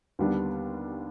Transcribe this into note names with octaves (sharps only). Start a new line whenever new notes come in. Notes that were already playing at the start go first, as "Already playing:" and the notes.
D#2 D3 G3 B3 D4